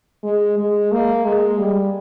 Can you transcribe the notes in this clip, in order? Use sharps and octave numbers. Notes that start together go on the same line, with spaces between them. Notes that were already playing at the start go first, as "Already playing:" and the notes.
G#3
G#3
A#3
G#3
G3